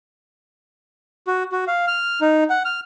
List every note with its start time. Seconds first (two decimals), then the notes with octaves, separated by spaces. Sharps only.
1.27 F#4
1.52 F#4
1.67 F5
1.87 F6
2.21 D#4
2.50 F#5
2.65 F6